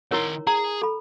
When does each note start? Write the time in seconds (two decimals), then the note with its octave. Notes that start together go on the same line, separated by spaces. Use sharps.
0.11 D#3 E4 A#4 C#5 C6
0.47 G#4 A#5
0.82 A4 B5